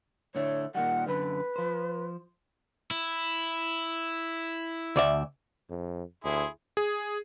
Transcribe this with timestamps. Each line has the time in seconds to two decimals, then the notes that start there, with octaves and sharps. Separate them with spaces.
0.35 A2 D3 A3 C#5
0.75 A#2 D#3 G3 F#5
1.08 F#2 D3 B4
1.56 F3 C5
2.91 E4
4.96 D2 D5 E5
5.70 F2
6.24 D2 E4 G#4 C6
6.77 G#4